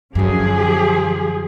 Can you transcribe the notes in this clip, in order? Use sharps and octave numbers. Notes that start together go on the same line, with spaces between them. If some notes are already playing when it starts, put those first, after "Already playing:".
F#2 D3 F3 G4 G#4